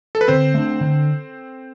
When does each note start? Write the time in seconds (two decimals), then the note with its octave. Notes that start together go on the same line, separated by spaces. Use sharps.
0.15 A4
0.21 B4
0.28 D3 C4 C5
0.54 A3 D4
0.81 D3